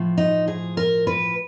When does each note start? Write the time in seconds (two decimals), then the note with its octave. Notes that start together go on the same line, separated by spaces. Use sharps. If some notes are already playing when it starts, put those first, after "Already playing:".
Already playing: A2 F3
0.18 D#4
0.48 G#4
0.77 A#4
1.07 B4